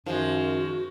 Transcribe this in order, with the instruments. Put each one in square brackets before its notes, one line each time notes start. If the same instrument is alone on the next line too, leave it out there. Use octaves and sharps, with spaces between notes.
[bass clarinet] F#2 [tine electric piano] D#3 [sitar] F3 G#3 [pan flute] F#4